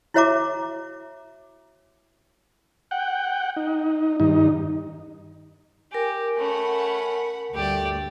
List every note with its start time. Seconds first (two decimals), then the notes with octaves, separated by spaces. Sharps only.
0.14 E4 F#4 C#5 E5 A#5 D6
2.91 F#5 G5
3.56 D#4
4.20 G2 D#3 D#4
5.92 G4 A#4 G#5
6.37 A3 C#4 F#5 B5
7.54 D2 G2 A3 G4 D5